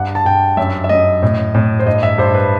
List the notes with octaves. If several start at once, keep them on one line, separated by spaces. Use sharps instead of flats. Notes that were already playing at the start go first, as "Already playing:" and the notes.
Already playing: G2 F#5
A5
G2 G5
F#2 E5
E5
F#2 D#5
A2
A2
C5
G2 D#5
E5
G2 C5
B4